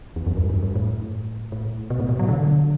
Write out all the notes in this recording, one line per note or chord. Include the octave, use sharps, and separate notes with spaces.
E2
F#2
G2
F#2
G2
A2
A2
B2
A2
B2
F#3
D3